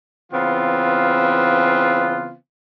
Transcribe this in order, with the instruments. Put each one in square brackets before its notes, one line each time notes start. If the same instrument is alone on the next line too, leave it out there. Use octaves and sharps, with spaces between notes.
[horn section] C#3 E3 B3 C4 F4